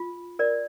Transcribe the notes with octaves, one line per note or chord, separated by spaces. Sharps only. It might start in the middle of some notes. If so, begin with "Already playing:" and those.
Already playing: F4
A#4 D5